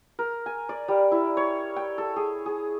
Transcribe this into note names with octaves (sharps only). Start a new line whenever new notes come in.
A#4
G#5
D5
G3
E4
C#5
G5
A4
G#4
G#4